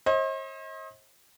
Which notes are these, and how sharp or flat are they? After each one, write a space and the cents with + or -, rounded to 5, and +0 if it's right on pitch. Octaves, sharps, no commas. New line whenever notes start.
C5 +45 D#5 +35